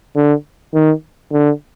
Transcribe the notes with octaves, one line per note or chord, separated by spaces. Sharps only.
D3
D#3
D3